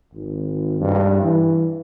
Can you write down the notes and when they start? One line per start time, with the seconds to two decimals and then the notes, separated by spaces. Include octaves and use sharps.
0.14 G#1
0.80 G2
1.22 E3